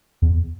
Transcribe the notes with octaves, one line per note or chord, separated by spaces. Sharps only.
E2